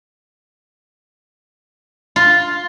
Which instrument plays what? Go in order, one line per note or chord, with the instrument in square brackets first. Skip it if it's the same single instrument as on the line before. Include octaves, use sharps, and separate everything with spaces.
[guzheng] F4